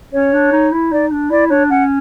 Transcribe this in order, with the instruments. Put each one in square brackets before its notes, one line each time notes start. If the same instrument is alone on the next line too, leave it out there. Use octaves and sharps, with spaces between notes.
[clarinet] C#4 [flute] C#5
[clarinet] D4
D#4
E4
[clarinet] D#4 [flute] D5
[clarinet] D4
[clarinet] E4 [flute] D5
[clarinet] D4 [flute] C#5
[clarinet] C#4 [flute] F#5